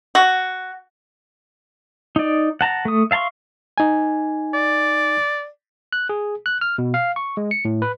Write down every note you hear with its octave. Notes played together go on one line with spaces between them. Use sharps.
F#4
D#4 D5
F#5 A5 A#5
A3 D#6
E5 F5 A5 C6 C#6
D#4 G#5
D5
F#6
G#4
F#6
F6
B2
F5
C#6
G#3
C#7
A2
B4